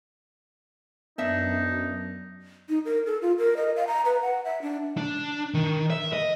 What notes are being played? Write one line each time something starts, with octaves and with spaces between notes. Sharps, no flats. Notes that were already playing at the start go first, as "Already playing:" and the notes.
F#2 B3 D4 D#4 E5
D#4
A#4
A4
F4
A#4
D#5
F5
A#5
B4
F#5
E5
D4
D4
D#3
E5
D#5